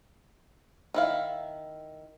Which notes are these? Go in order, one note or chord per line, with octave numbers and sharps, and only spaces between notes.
D#3 E4 F5